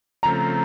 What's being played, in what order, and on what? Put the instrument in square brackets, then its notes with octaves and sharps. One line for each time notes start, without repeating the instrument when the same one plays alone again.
[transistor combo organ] C#3 F3 A3 C4 [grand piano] A#5